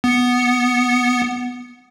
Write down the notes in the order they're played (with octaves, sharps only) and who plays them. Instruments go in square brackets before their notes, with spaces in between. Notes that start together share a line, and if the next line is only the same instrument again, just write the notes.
[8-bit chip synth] B3 C#7